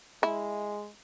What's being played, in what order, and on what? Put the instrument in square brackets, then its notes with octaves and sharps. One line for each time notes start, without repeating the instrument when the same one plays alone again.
[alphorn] G#3 [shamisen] E4